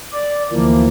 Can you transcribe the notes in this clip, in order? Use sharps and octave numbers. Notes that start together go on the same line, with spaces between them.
D5
D2 E3 F3 A#3